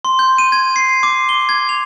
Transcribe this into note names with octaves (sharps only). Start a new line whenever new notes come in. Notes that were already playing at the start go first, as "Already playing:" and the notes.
C6
G6
D#7
G#6
C7
D6
G7
G#6
F7